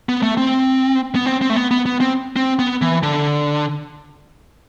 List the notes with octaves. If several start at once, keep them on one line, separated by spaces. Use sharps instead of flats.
B3
A3
C4
B3
C4
C4
A3
B3
B3
B3
C4
C4
B3
E3
D3